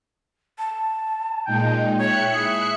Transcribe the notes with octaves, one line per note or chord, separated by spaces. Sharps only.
A5
A#2 G#3 D#4 G5
C#5 E5 G5 F#6 C#7
E4 G#4